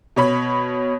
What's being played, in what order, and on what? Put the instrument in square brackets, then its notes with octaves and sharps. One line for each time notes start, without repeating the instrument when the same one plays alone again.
[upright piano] B2 C#5 B5